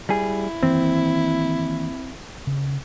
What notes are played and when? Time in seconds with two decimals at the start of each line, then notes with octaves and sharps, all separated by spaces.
0.09 G3 E4 G#4
0.63 D#3 E3 A#3 C4
2.47 C#3